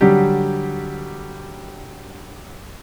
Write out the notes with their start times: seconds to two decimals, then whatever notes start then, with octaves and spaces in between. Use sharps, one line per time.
0.01 D3 F#3 G3 G4